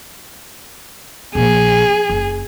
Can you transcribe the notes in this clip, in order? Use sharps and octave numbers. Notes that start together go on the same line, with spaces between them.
A#1 A#2 G#4
F#1